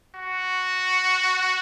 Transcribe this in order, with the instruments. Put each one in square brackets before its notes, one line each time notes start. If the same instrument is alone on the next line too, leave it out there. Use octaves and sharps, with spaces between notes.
[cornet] F#4